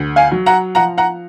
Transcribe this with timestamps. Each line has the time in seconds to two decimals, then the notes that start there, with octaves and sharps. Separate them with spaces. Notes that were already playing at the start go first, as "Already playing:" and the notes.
Already playing: D2
0.16 F5 G#5
0.31 F#3
0.46 F#5 A#5
0.75 F3 F#5 A#5
0.98 F#5 A#5